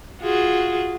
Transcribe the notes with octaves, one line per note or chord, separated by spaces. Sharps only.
F4 F#4 G#4